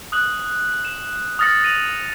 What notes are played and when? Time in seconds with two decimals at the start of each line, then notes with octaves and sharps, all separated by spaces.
0.12 D#6 F#6 F#7
0.85 E7
1.39 D#6 F6 A6 A#6 C#7 F#7
1.63 A#6 D#7 F7 F#7